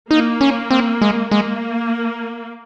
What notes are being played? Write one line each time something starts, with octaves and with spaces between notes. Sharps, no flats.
A#3 D#4
C#4
C4
G#3
G#3 A#3